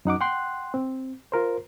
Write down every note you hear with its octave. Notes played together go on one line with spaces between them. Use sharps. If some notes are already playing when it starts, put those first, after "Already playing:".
F#2 D#4 F#5 D6
F#5 G5 C6 F#6
C4
F4 A#4 C5